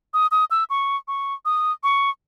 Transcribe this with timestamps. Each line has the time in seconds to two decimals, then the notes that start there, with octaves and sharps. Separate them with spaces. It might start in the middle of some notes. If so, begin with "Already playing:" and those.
0.14 D#6
0.31 D#6
0.51 E6
0.70 C#6
1.08 C#6
1.45 D#6
1.83 C#6